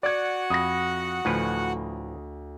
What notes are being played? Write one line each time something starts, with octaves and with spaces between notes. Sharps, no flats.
F#4 D5 F#5 G#6
F2 B5 D#6 A#6
D2 A2 F3 B4 G#5